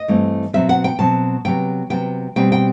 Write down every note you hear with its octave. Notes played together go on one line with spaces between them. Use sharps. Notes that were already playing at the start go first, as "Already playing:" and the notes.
Already playing: D#5
G2 E3 A3 C4
B2 F#3 C4 E5
F#5
G5
B2 F#3 C4 A5
C3 F#3 B3 G5
C3 F#3 B3 G5
B2 G3 C4 G5
G5